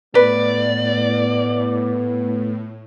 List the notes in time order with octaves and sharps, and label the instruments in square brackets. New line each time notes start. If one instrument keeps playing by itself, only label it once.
[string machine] A2 [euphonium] B3 [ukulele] B4 [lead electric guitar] D5